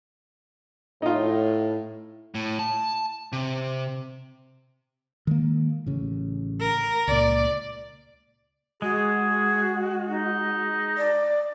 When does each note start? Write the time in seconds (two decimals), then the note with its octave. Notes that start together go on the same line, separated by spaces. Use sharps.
1.02 A2 D#4 F4
2.35 A2
2.59 A5
3.32 C3
5.27 D#3 G#3 A#3
5.86 A1 C#3
6.60 A#4
7.07 C#2 A#2 D5
8.82 G#3 F#4 G#4
10.10 D#4
10.97 D5